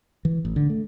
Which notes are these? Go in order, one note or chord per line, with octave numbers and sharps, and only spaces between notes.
E3
A1
D3
A3